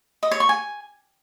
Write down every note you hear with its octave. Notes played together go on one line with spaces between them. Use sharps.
D#5
C#5
C#6
G#5